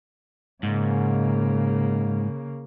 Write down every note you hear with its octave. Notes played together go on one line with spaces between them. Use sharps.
G#2 C#3 A#3